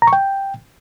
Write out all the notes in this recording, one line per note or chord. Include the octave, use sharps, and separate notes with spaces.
A#5
C#6
G5